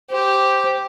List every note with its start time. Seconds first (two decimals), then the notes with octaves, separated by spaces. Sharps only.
0.11 G4 C5